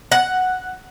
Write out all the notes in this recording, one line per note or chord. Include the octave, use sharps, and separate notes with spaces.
F#5